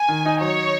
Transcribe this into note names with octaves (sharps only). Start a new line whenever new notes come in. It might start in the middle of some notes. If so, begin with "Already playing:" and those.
Already playing: G#5
D#3
D#4
F#3 C#5